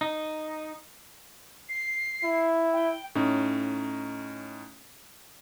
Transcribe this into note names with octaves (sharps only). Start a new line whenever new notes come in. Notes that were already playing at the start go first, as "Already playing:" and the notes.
D#4
C7
E4
G5
A2 C#4 D#4